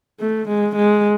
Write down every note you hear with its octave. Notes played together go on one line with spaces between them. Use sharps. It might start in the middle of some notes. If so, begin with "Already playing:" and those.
A3
G#3
G#3